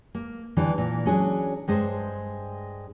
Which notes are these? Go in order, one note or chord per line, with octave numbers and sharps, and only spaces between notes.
A#3
D3 E3 G3 D4
A#2 E3
F#3 C#4 D4 G#4
G2 G#3 G#4 C5